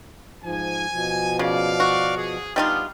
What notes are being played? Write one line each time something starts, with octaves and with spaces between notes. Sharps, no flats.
G#2 F3 G#5
B2 F3
C#3 D5 F5
F#4
G#4
G3 B3 D4 D#4 F4